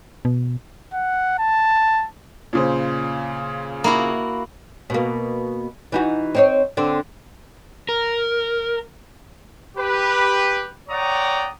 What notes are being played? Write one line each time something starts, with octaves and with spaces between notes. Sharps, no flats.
B2
F#5
A5
A#2 C#3 C5
A#3 E4 F#4
B2 A#3
E3 D#4 F#4
C4 D#4 C#5
D3 C4
A#4
G4 B4
C#5 D5 F#5 G5 A#5 D#6